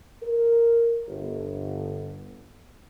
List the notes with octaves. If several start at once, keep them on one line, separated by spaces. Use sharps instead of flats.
A#4
G1